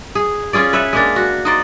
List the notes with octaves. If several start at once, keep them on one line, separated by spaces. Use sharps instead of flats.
G#4
C#4 F4 G#4 D5
B4 C#5 E5
G#3 A#3 D4
F#4
D#4 C5 D5